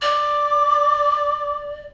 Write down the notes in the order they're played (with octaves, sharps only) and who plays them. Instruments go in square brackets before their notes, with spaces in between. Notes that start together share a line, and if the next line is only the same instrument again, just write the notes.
[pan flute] D5 [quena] D6